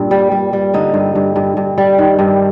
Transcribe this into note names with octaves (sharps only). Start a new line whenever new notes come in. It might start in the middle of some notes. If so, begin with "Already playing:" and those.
Already playing: G2 A#2
G3
G3
G3
D3 D#4
G2
G2
G2
G2
G3
D#3
G2